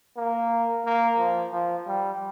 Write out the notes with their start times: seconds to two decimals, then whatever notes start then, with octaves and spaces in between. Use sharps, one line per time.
0.17 A#3
0.85 A#3
1.19 F3
1.53 F3
1.87 G3